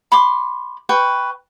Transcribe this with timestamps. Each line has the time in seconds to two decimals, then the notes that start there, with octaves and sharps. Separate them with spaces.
0.12 B5 C6 D6
0.89 B4 G5 C#6